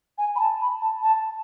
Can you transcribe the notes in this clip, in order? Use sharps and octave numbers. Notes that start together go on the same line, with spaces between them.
G#5
B5
A5
B5
A5
A5